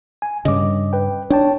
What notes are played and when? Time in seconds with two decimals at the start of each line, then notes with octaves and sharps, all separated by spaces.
0.22 G#5
0.45 G2 C#3 D#5 D6
0.93 B4 G5
1.30 D4 C#5 G5 A5